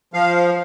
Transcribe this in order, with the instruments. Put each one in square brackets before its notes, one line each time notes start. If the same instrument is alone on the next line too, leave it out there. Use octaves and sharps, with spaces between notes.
[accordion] F3 F5